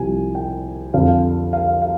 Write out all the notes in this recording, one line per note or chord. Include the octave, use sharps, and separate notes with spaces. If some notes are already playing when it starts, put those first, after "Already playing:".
Already playing: C2 C3 F3 G#5
G5
F2 D3 F3 F5
F5
F5